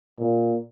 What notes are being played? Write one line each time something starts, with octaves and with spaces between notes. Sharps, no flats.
A#2